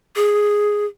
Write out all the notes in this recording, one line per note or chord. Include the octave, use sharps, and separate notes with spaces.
G#4